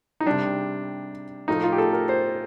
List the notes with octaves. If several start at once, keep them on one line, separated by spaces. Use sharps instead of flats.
D#4
C3 G3 D4
A2 F3 A3 D#4
F4
G4
A4
A#4
C5